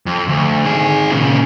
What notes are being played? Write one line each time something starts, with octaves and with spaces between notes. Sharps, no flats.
F2
D2
D#3 G#4
A#2 C#3